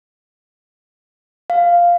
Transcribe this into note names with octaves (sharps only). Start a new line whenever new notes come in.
F5